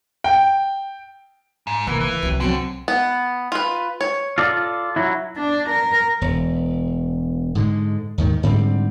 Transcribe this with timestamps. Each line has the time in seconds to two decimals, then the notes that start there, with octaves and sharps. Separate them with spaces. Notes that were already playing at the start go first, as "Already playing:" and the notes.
0.24 G5
1.67 G#2
1.87 C3 E3 A#3 F4
2.01 D2 E3
2.23 C2 C3 F3 F#3
2.40 B2 D3 F#3 C4
2.88 B3
3.52 F4 B4
4.01 C#5
4.38 F4 A4 D5
4.96 F#3 E4
5.37 D4
5.70 A#4
6.21 E1
7.55 G#2 D3 G#3
8.18 D#2 G#2 D#3
8.43 G#2 D3 G3 C4